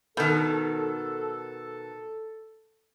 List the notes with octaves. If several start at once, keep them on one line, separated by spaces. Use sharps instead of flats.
B2 D#3 A4